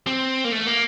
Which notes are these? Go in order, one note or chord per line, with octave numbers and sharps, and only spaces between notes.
C4
A#3
A3
A#3